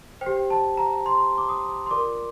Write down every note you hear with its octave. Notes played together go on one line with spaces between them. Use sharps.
C5 G5
G4
A5
A#5
C6
D6
D#6
C6
F4 A#4 D5 D6